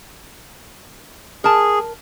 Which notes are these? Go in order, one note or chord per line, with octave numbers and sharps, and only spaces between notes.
G#4 A#4 A5